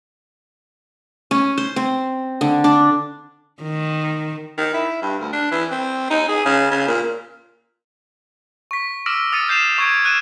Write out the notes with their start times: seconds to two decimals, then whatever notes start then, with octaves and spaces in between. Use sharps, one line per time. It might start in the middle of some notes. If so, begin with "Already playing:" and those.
1.31 C#4
1.58 C5
1.76 C4
2.41 D3
2.64 D4
3.63 D#3
4.58 D#3
4.74 E4
5.02 G2
5.20 D2
5.33 D4
5.51 E3
5.71 C4
6.10 D#4
6.28 G#4
6.45 C#3
6.72 C#3
6.88 A#2
8.71 C#6 B6
9.06 D6 E6 F6 A#6 B6 D7
9.32 D#6 F6 A6 C#7 D#7
9.48 F6 G6 C7 E7 F7
9.78 C#6 G#6 D7
10.05 F#6 D#7 E7